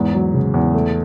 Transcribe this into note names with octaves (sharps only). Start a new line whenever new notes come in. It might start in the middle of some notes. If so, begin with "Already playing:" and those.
Already playing: E2 G#2
F#3
C#3
E2
A3